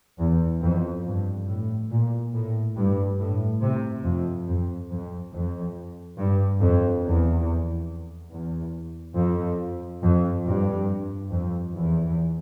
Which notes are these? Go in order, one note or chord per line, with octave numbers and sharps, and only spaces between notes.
E2
F2
G2
A2
A#2
A2
G2
A2
C3
F2
F2
F2
F2
G2
F2
E2
E2
F2
F2
G2
F2
E2